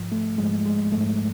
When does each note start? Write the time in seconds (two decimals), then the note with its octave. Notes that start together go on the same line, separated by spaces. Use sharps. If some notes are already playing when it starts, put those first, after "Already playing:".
Already playing: G#2 F3
0.12 A3
0.38 G#2 F3 G#3
0.66 G#3
0.92 G#2 F3 A3